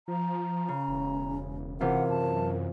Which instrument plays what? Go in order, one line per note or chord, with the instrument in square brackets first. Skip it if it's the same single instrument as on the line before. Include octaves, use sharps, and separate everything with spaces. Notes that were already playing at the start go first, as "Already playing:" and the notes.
[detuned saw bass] F3 [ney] A#5
[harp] C#3 [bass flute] C#4
[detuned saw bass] E1
[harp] C3 E3 F4 [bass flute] A#4 [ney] F#5
[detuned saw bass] F#2 [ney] A5